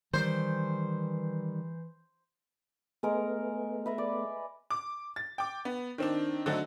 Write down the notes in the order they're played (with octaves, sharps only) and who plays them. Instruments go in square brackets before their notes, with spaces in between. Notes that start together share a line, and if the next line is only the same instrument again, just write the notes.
[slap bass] D#3 G3 [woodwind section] E3 [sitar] C5
[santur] G#3 A#4 [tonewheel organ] A3 B3
[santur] B4 E5 A#5
D5
[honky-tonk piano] D6
A6
G5 D6
B3
D#3 C4 D4
D3 F#3 A3 C4 D#4 F#4